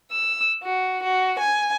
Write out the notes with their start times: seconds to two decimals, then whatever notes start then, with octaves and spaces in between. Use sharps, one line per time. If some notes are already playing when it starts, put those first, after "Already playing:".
0.12 E6
0.63 F#4
1.03 F#4
1.40 G#5